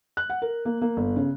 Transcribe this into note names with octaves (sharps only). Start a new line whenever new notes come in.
F#6
F#5
A#4
A#3
A#3
G1
C#3